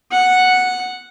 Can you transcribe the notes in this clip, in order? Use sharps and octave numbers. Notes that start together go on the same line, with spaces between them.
F#5